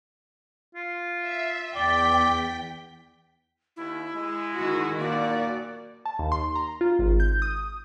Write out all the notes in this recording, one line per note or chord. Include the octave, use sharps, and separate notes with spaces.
F4
E5
E2 D5 G5 B6
D#2 E4
G#3
D#3 F#4
B1 A#2 A#3 F#4 D5
A5
D#2
C6
A#5
F4
G#1
G6
D#6